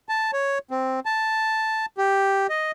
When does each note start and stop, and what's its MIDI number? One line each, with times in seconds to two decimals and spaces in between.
0.09 0.31 81
0.33 0.58 73
0.71 1.00 60
1.06 1.86 81
1.98 2.47 67
2.49 2.71 75